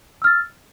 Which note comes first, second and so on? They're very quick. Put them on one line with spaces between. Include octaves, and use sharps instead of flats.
E6 F6 A6